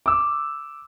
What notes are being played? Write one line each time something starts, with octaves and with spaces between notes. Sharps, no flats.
D6 E6